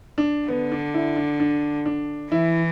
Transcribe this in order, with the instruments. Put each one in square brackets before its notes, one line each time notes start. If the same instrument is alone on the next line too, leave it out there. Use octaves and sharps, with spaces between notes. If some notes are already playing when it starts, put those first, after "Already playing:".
[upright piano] D4
[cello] D3 [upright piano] B3
[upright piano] D4
E4
D4
D4
D4
[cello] E3 [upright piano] E4